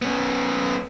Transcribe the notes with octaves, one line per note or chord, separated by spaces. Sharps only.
B3 C#4